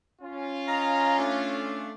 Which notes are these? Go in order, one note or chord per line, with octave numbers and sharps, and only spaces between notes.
C#4 F4
D#5 F5 A#5
A3 D4